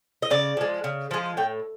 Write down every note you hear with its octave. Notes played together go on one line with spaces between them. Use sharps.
D#5
C#3 D5
F3 G#3
C#3
F3 G#3
A2 G5